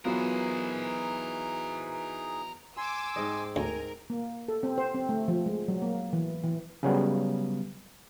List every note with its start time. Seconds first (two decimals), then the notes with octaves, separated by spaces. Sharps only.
0.05 E3 F#3 B3 D#4 F4 G#4 A#4 C5
2.77 G#5 C6 D6 E6
3.16 G#2 C4 D#4
3.56 D2 A#4 G#5
4.10 A#3
4.48 A4
4.63 C4
4.78 C5
4.94 C4
5.09 A3
5.28 F3
5.46 G#3
5.68 F#3
5.82 A#3
6.13 E3
6.44 E3
6.83 C#3 F#3 G3 B3